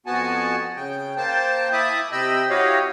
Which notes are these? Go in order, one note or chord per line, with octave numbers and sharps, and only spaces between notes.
F2 B3 F#4 F#5 G#5 A5
C#3 G5
A#3 C5 G5 A5
E4 E5 A5 B5 D6 D#6
C3 D#5 G5 B5 E6
E4 F#4 G4 C#5 D#5 F5